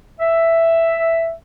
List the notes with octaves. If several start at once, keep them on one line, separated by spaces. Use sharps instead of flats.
E5